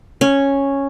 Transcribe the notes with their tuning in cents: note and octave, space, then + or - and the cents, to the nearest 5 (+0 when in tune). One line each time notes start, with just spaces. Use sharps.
C#4 -5